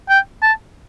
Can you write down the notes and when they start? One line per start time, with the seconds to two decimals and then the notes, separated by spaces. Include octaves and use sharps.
0.09 G5
0.42 A5